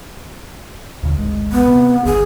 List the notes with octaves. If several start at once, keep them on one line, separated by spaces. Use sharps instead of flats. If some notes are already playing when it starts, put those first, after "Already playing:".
D2 C#3
D1 G#1 G#3
B3
C3
G1 C#2 G#4